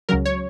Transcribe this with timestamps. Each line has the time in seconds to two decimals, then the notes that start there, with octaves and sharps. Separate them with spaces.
0.09 C#2 C#3 F#3 A#4
0.25 C#5